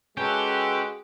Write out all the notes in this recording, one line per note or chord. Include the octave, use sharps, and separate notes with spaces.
G#3 C#4 F#4 G4 A4 B4